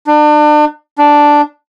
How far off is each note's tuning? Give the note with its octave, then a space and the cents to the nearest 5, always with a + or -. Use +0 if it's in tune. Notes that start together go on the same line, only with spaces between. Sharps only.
D4 +35
D4 +0